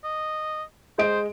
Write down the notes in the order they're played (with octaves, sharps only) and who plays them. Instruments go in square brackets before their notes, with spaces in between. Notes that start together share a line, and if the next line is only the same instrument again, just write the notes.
[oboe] D#5
[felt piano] G#3 D#5 D7 [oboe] C5